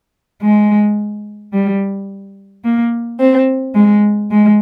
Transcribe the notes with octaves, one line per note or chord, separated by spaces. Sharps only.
G#3
G3
A#3
C4
G#3
G#3